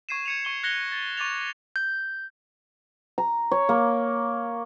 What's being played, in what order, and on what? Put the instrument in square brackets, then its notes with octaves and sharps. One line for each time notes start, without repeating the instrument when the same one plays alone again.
[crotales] C#6 G#6 C7 D#7 E7
G#6 C#7 F7
C#6 G7
F#6 G#6 A#6 C#7 F7 G7
A6
C#6 D6 A6 F7
[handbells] G6
[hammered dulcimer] A#5
C#5
A#3